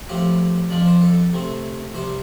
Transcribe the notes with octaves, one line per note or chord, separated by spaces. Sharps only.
A2 F3 C4 G4
F2 F3 D4 D5
C5
A4
C3 A3 C4
C2 C3 G3 C5